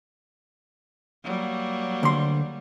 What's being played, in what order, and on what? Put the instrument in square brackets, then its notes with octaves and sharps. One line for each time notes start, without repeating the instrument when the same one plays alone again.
[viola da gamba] F#3 G3 A#3
[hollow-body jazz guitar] D2 C6